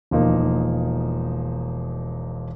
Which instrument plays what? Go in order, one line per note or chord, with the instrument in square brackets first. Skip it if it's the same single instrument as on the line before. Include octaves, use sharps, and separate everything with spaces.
[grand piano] E1 F3 A#3 D#4